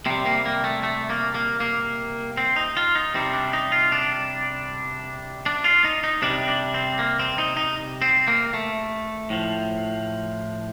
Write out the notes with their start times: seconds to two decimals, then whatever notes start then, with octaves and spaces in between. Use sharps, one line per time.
0.06 C3 G3 C4
0.26 A#3
0.46 A#3
0.64 A3
0.83 A3
1.10 A#3
1.35 A#3
1.60 A#3
2.37 C4
2.56 D#4
2.77 F4
2.95 D#4
3.14 C3 G3 C4
3.33 D4
3.53 D#4
3.72 F4
3.92 D4
5.46 D4
5.64 F4
5.84 D#4
6.04 D#4
6.22 C3 G3 D4
6.48 D4
6.74 C4
6.99 A#3
7.19 C4
7.38 D#4
7.57 D#4
8.02 C4
8.28 A#3
8.54 A3
9.30 A2 F3